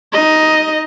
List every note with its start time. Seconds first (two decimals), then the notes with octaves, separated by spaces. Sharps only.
0.13 D#4 D#5